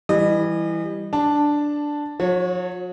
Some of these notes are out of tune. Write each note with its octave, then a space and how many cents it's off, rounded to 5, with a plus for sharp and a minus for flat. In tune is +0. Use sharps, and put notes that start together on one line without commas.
E3 +0 G3 +5 D#5 -35
D4 +0 A5 +0
F#3 -45 C#5 +0